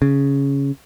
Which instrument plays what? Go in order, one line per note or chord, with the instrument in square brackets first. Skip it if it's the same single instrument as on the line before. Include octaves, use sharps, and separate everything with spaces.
[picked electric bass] C#3